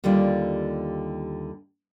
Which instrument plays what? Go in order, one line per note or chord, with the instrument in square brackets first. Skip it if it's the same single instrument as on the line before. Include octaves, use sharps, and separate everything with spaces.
[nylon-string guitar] D#2 D3 G3 F4 D5